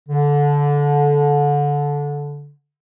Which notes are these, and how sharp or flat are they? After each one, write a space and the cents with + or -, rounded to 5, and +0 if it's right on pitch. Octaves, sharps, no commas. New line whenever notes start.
D3 -20